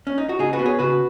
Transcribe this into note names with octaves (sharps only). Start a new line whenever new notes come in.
C#4
D#4
F#4
C#3 D#4 G#4
F#4 B4
B3
G#4 C#5
C#3 F#4 B4